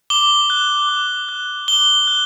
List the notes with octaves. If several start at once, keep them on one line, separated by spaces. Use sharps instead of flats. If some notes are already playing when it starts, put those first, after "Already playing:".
D6 G7
F#6
D6
F#6
D6 G7
F#6